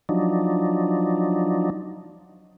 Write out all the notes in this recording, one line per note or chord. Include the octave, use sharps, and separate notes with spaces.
F3 F#3 D4 D#4